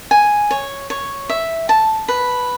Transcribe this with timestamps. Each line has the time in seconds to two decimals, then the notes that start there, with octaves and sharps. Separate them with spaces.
0.11 G#5
0.51 C#5
0.90 C#5
1.30 E5
1.69 A5
2.08 B4